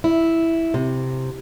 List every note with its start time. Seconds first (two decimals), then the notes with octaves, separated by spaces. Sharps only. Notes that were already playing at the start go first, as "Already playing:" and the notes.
0.04 E4
0.74 C3